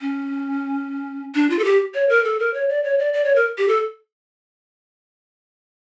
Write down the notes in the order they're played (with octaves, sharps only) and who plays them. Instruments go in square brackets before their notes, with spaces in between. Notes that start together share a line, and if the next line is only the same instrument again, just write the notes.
[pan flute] C#4
D4
F4
A4
G4
C#5
A#4
A4
A#4
C#5
D5
C#5
D5
D5
C#5
A#4
G4
A4